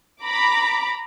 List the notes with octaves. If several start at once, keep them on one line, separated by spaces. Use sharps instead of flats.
A#5 B5 D6